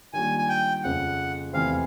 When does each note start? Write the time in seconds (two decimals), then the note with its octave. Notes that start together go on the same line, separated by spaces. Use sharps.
0.13 D#3 G3 A#3 D4 F4 G#5
0.39 G#5
0.49 G5
0.83 F2 C#3 F3 F#5
1.53 E2 C3 E3 A3 C4 F5